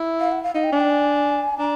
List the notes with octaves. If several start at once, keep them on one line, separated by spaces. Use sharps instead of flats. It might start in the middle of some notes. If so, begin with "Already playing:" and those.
Already playing: E4
F5
F#5
F5
D#4 F5
G5
D4 G#5
G5
G#5
D4 A#5